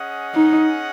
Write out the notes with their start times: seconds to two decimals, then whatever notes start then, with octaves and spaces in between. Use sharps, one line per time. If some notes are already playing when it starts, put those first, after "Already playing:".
Already playing: C#4 G#4 D#5 F#5
0.34 D#4